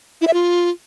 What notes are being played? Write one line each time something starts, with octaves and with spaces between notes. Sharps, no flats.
E4
E5
F4